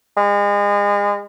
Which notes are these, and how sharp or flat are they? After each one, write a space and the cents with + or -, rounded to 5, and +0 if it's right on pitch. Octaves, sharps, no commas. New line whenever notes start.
G#3 -35